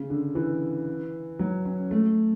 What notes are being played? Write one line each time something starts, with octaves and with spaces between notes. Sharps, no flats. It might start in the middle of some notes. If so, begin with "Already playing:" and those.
Already playing: C#3
D3
E3
F#3
C#4
A3